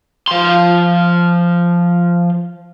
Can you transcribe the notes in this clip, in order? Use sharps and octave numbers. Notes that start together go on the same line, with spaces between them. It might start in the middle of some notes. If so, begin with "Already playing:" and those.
F3 C6